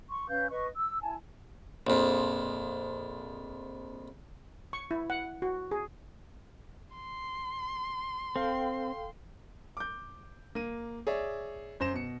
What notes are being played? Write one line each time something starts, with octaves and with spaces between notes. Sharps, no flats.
C6 C#6
C#4 B4 F5 G6
B4 D#5 C#6
E6
E4 G#5 A5
A#1 F2
C#6
E4
F#5
F#4
G#4
C6
C4 A4 F5 G5
D6 G6
A#3 D#7
G#4 C#5 D5 E5
F#2 C5 A#6 E7
B2 C#7